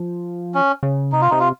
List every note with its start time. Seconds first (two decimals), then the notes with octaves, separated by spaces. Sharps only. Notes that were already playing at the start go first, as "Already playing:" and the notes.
Already playing: F3
0.54 C#4
0.83 C#3
1.12 C3 D#4
1.21 F4
1.30 C3 D#4
1.40 F4